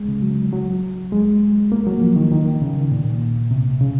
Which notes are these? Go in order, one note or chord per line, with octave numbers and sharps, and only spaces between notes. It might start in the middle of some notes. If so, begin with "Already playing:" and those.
Already playing: G#3
C#3
F#3
F#3
G#3
A#3
F#3
F3
D#3
D#3
C#3
A#2
C3
C#3